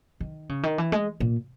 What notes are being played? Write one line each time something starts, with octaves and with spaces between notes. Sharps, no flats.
D#3
C#3
D#3
E3
G#3
A#2